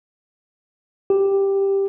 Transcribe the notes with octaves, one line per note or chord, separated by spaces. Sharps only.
G4